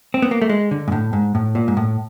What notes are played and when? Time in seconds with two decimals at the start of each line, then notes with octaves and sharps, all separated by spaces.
0.14 C4
0.22 B3
0.31 A#3
0.42 A3
0.49 G#3
0.71 D3
0.88 G#2
0.92 A2
1.13 G#2
1.35 A2
1.55 A#2
1.68 G#2
1.77 A2